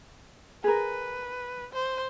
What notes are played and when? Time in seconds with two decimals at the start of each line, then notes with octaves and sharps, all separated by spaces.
0.64 G#4 A#4 B4
1.73 C5